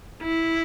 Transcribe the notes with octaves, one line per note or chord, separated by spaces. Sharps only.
E4